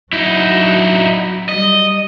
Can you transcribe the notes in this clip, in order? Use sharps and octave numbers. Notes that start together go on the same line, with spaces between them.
F#3 D#4 E4
G3 D#5